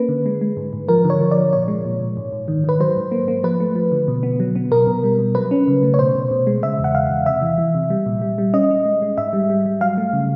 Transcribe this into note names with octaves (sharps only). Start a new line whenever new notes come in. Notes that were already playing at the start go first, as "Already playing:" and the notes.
Already playing: A#3 C#4 B4
D3
G#3
G#3
G#2
G#2
F3 A#4
D3
C#5
F3
D5
F3
A#2 C#5
G#3
A#2
A#2
G#2
G#2
D#3
D#3 B4
F#3 C5
G#2
A#3
A#3
F3 B4
A3
F3
D3
B2
B3
F#3
B3
B2 A#4
B2
G3
B2
F#3 B4
C#4
C#3
A3
C#5
B2 C5
B2
B2
G#3
C#3 E5
E2
F#5
E2 F5
E2
C3 E5
E3
E3
C3
G3
A#2
G3
G3
C#4 D#5
C#4
G#3
G#3
G#2 E5
G3
G3
G3
F#3 F5
A3
C#3